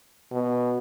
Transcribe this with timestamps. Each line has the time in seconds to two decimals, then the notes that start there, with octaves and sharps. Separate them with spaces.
0.31 B2